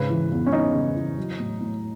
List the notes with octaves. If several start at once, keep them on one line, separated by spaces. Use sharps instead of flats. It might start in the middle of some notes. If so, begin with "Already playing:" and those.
Already playing: G#2 C#3 B4
E3
E2
C#4
E2 D#4
C#3
E3
F#3
A2
A2